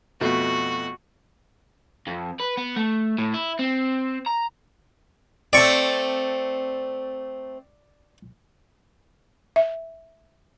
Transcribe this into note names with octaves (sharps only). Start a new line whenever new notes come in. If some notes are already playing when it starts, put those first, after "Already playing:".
F2 B2 A3 F#4
F2
B4
B3
A3
A2
E4
C4
A#5
A3 C4 D5 C#6
E5